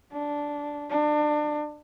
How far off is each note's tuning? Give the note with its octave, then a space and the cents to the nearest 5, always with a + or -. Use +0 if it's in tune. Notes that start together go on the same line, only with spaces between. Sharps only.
D4 -5
D4 +30